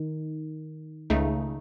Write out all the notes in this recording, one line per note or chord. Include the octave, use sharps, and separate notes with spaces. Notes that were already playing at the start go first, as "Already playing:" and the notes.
Already playing: D#3
C#2 C#3 A3 D#4